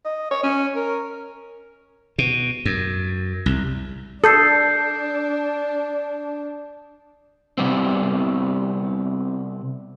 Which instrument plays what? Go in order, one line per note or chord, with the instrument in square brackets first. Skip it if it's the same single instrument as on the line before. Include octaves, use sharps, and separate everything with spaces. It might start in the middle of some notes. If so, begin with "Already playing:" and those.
[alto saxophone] D#5
C#5
C#4
A#4
[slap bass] B2
F#2
C2
[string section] D4 [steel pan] A4 [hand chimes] D#6 G6 C7
[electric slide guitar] C3 G3 B3 C4